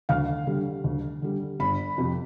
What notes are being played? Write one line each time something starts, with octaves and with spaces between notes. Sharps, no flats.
D2 F5
D3 G3
D2
D3 G3
G1 B5
F2 C3 F3